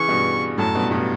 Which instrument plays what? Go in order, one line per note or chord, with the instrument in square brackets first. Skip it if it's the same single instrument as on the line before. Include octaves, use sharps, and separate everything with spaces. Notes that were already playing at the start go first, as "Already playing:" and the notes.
Already playing: [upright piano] C#3 E3 [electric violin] C#6
[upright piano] G2 B2
[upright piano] F#2 A2 [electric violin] A5
[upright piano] G2 B2
G2 B2